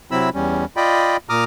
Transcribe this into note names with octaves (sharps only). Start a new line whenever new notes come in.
C3 F#3 C4 E4 B5 E6
E2 G3 C#4
F4 D5 D#5 G5 B5
A#2 A#5 D6 D#6 F6